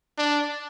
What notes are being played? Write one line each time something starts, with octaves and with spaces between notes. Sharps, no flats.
D4